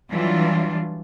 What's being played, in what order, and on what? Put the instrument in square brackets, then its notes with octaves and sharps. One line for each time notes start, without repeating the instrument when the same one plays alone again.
[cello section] E3 F#3 G3 D4 F4